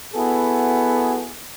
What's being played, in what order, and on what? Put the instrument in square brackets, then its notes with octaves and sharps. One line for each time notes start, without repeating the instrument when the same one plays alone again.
[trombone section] B3 E4 F#4 G#4 A4